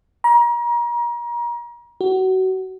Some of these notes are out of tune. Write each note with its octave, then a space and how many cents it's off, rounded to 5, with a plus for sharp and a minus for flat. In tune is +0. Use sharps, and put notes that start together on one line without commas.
A#5 +35
F#4 +25